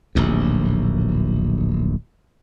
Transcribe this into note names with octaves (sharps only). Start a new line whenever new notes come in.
D1 A#1 D#2